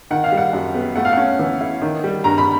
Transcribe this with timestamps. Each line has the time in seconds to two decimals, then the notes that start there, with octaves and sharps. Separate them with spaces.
0.11 D#3 F#5
0.24 F5
0.32 G3
0.38 F#5
0.53 F#2
0.74 B3
0.96 A3 F#5
1.05 F5
1.13 C#4 F#5
1.39 E3
1.61 E4
1.81 D#3
2.04 G3
2.24 G2 A#5
2.38 B5